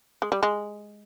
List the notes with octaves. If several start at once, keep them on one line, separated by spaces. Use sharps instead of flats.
G#3
G3
G#3